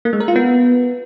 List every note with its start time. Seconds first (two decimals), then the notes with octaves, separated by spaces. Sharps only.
0.05 A#3
0.13 G#3
0.20 A#4
0.28 F4
0.36 B3